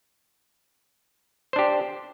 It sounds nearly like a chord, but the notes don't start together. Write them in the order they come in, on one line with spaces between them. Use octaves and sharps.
C5 D4 G4